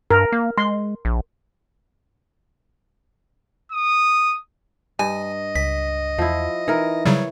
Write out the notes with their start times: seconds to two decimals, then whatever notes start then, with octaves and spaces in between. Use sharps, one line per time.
0.11 G2 A#4
0.32 A#3
0.58 G#3 C6
1.05 A#1
3.72 D#6
4.99 G2 D#5 G#5
5.56 C#2 B6
6.18 E2 F3 E4
6.68 E3 D#4 A#4
7.05 C#3 F#3 G3 C#5